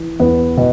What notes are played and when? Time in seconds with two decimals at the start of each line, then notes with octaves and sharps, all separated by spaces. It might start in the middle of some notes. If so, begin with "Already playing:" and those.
Already playing: E3
0.20 E2 B3
0.57 B2